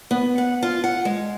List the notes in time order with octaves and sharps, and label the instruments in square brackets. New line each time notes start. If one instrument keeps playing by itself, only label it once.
[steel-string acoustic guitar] B3
F#5
F4
F#5
G#3